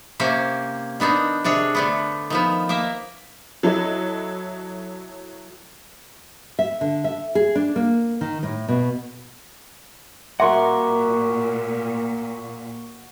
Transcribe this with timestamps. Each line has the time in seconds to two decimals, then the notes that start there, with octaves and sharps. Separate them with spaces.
0.20 C3 A#3 C4 C#4
1.00 D#3 B3 D4 D#4
1.44 C3 D4 G#4 C#5
1.75 D3 A3 B3
2.30 D#3 F3 B3
2.69 A#3 A#4 E5
3.63 F#3 E4 A4 D#5
6.59 E5
6.81 D3
7.04 E5
7.35 G#4
7.55 D4
7.76 A#3
8.21 D#3
8.43 A2
8.69 B2
10.40 A#2 F#4 A#4 E5 F#5 C6 D6